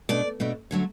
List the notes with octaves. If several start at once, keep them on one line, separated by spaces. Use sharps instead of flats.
B2 A3 D4 D5
B2 A3 D4
D3 F#3 A3 C#5